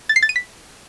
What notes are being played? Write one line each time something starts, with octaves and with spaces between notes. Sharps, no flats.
A6
C7
A6
D#7
B6